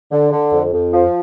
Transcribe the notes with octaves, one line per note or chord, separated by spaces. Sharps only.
D3
D3
F2
F2
F3